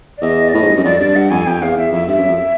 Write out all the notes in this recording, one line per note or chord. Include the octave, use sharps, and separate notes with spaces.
D5
E2 D#5
D5
A2 D#5
G#2
G2
F#2
F2 D5
G2 D5
G2 F#5
F2 G#5
F2 G5
E2 F5
E2 E5
F2 E5
G2 E5
F#2
F2